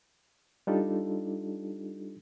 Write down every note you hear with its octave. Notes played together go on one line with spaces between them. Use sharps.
G3 D4 D#4 F4 G4 A4